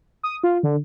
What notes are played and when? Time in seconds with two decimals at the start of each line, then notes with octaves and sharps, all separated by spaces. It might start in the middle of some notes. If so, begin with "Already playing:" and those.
0.23 D#6
0.43 F4
0.63 D3